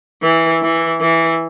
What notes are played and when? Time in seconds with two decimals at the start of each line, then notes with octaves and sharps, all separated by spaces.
0.22 E3
0.62 E3
1.01 E3